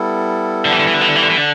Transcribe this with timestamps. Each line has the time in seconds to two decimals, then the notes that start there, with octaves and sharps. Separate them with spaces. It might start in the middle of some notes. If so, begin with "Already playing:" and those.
Already playing: G3 B3 E4 A4
0.65 D3
0.72 E3
0.80 D3
0.87 E3
0.94 D3
1.01 E3
1.08 D3
1.16 E3
1.23 D3
1.30 E3
1.37 D3